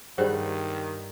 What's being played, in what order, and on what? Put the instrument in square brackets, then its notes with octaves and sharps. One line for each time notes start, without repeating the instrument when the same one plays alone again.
[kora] G2 G3 [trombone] D#3 [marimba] G#4 C5 F#5